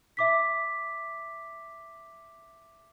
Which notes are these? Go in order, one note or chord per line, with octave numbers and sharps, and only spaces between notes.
E5 D6 B6